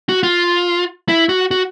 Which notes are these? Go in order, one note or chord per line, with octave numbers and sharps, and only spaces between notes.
F#4
F4
E4
F#4
F#4